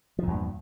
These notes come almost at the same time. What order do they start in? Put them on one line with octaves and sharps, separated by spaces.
F3 A#2 E2 G2